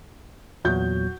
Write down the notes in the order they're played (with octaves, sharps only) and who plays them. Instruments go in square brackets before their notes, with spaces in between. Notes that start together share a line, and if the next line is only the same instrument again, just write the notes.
[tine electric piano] E2 A#2 F#3 [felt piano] F#4 G6